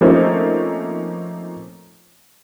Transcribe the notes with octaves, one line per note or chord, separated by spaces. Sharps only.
F3 A3 A#3 C4 C#4 D#4